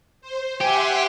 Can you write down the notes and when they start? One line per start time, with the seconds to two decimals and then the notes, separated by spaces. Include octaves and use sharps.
0.21 C5
0.61 G4 E5 F#5 G#5 C6